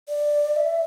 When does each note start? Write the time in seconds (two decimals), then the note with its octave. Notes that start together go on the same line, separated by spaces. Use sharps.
0.09 D5
0.56 E5